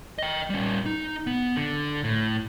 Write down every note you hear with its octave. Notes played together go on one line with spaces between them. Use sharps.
D#5 G5
G3 C#4
D#4
B3
D3
A2